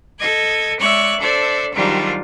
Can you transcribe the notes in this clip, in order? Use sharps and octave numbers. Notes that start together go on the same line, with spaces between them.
A4 D#5 G#6
G#3 C#5 D5 E5 C#6 F#6
D4 A4 C5 D5 E5
G#2 D#3 F#3 G3 D4 F4